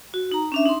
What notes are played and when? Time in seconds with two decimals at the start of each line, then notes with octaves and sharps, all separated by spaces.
0.14 F#4
0.32 D#4 A#5
0.52 C#4 D4 E5
0.66 D#4 C6